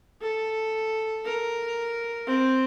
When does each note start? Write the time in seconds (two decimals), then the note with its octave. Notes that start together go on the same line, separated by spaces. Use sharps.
0.21 A4
1.25 A#4
2.27 C4